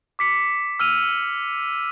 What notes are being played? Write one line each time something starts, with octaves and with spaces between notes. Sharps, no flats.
D6 B6 C#7
E6 F6 D#7 F7